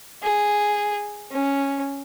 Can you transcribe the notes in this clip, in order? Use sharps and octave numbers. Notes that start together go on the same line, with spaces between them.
G#4
C#4